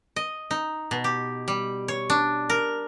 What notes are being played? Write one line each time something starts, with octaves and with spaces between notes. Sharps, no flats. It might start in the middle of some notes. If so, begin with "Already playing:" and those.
D#5
D#4
B2
G4
G3
C#5
D4
A#4